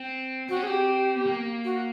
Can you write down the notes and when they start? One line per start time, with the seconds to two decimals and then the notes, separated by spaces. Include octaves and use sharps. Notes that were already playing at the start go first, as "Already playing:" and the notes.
Already playing: C4
0.49 C4 F#4
0.56 C#4
0.63 C4 G4 G#4
1.15 B3
1.26 A#3
1.64 F#4